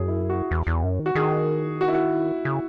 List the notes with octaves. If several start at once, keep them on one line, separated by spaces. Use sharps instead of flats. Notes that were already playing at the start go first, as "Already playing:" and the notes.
Already playing: F#2 G#4
E4
F#4
E2
E2
F#2
D#3
F#4
D#3 G#4
F#4
E4
F#4
C#3